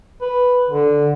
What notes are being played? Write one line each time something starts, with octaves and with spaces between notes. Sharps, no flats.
B4
D3